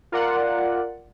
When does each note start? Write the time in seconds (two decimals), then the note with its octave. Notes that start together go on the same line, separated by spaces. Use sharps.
0.12 F4 A#4 D5 F#5